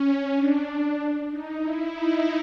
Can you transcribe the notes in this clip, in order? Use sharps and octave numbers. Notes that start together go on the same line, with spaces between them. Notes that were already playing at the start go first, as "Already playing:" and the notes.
Already playing: C#4
D4
D#4
E4
D#4